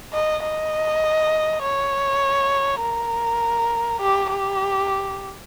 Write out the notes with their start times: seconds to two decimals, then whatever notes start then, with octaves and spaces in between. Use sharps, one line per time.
0.13 D#5
0.43 D#5
1.62 C#5
2.81 A#4
4.01 G4
4.30 G4